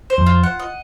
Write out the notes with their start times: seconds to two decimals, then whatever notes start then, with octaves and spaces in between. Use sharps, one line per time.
0.10 C5
0.18 F2
0.26 F4
0.43 F#5
0.59 D#5